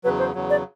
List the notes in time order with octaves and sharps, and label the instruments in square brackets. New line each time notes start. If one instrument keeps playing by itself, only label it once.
[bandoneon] E2 C#3 F#3 [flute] B4
[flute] C5
[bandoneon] E2 C#3 F#3
[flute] D5